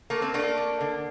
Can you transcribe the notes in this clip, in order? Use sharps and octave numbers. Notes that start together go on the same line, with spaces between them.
A3 A#3
C4
A3 A#3 D4
A3
D3